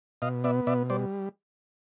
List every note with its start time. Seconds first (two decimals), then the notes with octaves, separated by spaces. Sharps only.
0.22 B2 D#5 F5
0.44 B3 D5 E5
0.67 B2 D5 E5
0.90 G3 C5 D5